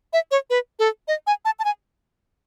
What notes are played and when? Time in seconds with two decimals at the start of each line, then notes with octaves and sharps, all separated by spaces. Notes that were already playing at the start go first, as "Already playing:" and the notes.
0.13 E5
0.31 C#5
0.50 B4
0.79 A4
1.08 D#5
1.27 G#5
1.45 A5
1.59 A5
1.65 G#5